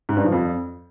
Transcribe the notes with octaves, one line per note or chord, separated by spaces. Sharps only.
G#2
G2
F3
F2